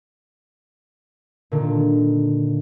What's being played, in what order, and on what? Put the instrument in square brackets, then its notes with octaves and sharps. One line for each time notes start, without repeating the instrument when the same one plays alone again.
[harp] A#2 D3 D#3